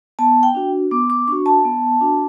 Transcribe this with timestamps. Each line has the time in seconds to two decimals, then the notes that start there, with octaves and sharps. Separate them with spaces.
0.19 B3 A5
0.43 G5
0.55 D4 F#4
0.91 B3 D6
1.10 D6
1.28 D4 F#4 C#6
1.46 A5
1.65 B3
2.01 D4 F#4